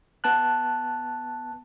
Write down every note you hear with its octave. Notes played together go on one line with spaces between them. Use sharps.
B3 A5 F#6